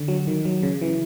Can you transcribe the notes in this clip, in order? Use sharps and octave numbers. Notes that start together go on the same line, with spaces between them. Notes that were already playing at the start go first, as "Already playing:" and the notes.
Already playing: D3
F#3
D#3
F#3
C#3
E3